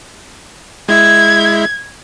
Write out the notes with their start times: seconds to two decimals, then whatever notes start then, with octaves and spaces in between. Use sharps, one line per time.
0.89 G#3 E4 E5 G#6